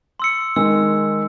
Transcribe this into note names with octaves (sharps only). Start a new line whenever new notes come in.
C6 E6 C#7
D#3 G#3 E6